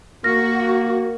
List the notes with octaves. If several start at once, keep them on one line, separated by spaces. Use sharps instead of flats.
A#3 F#4 F6 A#6